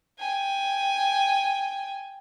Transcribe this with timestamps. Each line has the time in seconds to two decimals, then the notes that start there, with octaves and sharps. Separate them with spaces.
0.19 G5 G#5